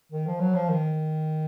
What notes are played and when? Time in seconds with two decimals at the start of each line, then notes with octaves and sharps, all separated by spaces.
0.12 D#3
0.27 F3
0.40 F#3
0.54 F3
0.69 D#3